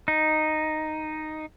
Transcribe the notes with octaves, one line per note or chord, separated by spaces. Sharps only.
D#4